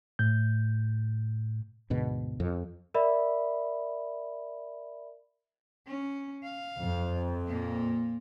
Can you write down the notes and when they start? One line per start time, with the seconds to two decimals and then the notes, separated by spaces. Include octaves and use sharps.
0.19 A2 G6
1.90 D2 G#2 B2
2.40 F2
2.94 A#4 D5 E5 B5
5.87 C#4
6.44 F5
6.79 F2
7.48 A#2 A#3